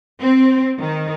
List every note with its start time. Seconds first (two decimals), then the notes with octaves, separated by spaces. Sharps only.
0.21 C4
0.79 D#3